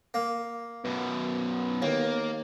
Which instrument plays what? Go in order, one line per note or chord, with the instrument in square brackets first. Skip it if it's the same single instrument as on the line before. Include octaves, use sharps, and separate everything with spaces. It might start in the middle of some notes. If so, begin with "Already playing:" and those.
[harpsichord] A#3
[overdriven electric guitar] F#2 B2 [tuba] B3
[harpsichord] D#2 [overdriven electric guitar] A#3